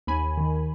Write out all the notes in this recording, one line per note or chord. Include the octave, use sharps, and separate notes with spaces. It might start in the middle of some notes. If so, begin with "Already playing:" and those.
D#2 G#5 B5
D#3